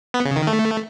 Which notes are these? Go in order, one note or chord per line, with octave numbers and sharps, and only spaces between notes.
B3
C#3
D#3
A3